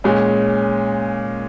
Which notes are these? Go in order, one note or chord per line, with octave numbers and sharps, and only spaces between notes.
A#2 G#3 C#4